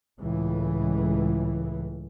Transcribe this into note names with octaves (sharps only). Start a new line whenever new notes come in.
C#2 A2 E3